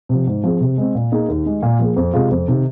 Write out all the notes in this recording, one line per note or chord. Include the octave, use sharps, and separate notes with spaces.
C3 F3
G#2
F3 C4 G#4
C3
G#3 C4
A#2
A#3 D#4 G#4
D#2
D#3 G#3
A#2
F3 A#3 G#4
F2
C3 G#3 F4 G#4
F2
C3 D#3